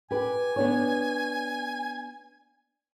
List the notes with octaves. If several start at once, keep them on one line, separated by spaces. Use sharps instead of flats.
G4 B4 G#5
B3 D4 C#5